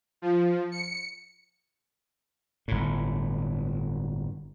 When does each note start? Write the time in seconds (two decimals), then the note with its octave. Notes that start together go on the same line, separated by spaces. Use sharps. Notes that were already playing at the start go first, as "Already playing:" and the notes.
0.22 F3
0.72 C#7
2.68 G1 A2